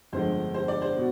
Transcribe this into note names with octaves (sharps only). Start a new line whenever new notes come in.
G1 F2 D3 G#3 C5
C5
D5
C5
B2